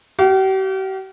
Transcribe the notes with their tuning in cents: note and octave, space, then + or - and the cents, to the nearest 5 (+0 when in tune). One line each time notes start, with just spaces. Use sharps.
G4 -45 F5 +0